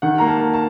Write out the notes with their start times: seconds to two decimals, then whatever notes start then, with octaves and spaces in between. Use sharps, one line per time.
0.02 D#3 F#5
0.18 A#3 A#5
0.28 A5
0.40 A#3
0.54 A5